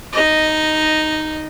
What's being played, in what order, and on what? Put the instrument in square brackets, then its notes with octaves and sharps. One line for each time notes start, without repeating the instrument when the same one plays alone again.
[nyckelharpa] D#4 D#5